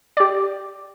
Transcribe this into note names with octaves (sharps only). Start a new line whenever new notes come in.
G4 D5